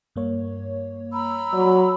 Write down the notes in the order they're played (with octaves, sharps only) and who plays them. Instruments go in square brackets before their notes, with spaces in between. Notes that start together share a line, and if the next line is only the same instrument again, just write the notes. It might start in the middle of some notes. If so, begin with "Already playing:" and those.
[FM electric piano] G2 A#3 C#5
[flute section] A#5 B5 E6
[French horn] F#3 [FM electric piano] D5